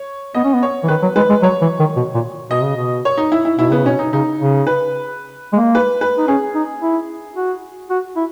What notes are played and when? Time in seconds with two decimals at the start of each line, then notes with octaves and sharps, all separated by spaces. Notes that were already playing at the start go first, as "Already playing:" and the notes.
Already playing: C#5
0.34 B3 D#5
0.44 C#4
0.54 B3
0.63 C#5
0.84 E3
0.88 D#3 B4
1.02 F#3
1.16 G#3 B4
1.29 G#3
1.42 F#3 C#5
1.61 E3
1.79 D#3
1.96 B2
2.15 A#2
2.50 B2 D#5
2.63 C#3
2.76 B2
3.05 C#5
3.18 D#4
3.32 E4
3.45 E4
3.59 B2 E4
3.71 C#3 B3
3.86 B2 C#4
3.99 D#4
4.13 C#3 D#4
4.39 C#3
4.67 B4
5.53 G#3
5.56 A#3
5.75 B4
6.01 B4
6.18 D#4
6.28 C#4 G#4
6.55 D#4
6.81 E4
7.36 F#4
7.90 F#4
8.16 E4